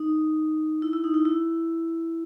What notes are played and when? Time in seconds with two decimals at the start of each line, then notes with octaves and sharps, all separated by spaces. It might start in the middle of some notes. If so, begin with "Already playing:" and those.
Already playing: D#4
0.82 E4
0.93 E4
1.04 D#4
1.14 E4
1.25 E4